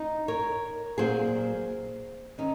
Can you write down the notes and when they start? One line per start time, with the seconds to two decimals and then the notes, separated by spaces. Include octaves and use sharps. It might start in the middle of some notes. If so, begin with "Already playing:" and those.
Already playing: D#4
0.28 A#4 C#5
0.98 A#2 F#3 A#3 G#4 C5
2.38 D#3 F#3 C#4 D#4